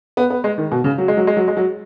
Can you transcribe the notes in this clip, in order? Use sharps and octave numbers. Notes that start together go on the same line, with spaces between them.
B3
B3
G#3
D#3
B2
C#3
F#3
G#3
F#3
G#3
F#3
G#3
F#3